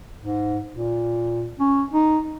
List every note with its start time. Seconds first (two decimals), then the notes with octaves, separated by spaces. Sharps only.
0.19 G#2
0.74 A#2
1.59 C#4
1.93 D#4